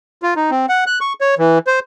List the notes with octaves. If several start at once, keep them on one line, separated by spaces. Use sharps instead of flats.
F4
D#4
C4
F#5
F#6
C#6
C#5
E3
C5